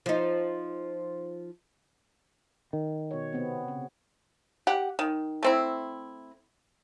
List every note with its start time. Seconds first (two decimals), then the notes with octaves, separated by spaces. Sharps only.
0.06 F3 D#4
2.73 D#3
3.11 B2 C#5
3.32 C3 B3 C4
3.68 C#3
4.67 G4 F#5
4.99 D#3
5.43 A3 C4 E4